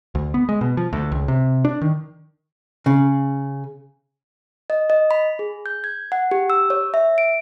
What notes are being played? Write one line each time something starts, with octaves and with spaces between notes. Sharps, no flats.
D2
B3
G#3
B2
F3
D2
C#2
C3
D4
D#3
C#3
D#5
D#5
B5
G#4
G6
G#6
F#5
G4
E6
C#5
E5
D7